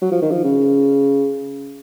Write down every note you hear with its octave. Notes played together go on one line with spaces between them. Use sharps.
F#3
F3
D#3
F3
C#3